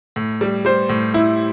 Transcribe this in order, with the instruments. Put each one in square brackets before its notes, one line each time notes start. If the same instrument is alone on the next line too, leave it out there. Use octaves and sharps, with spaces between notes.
[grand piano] A2
G3
G3 C5
A2
A2 E4